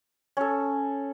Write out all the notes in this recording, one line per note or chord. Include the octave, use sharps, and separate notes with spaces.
C#4 A4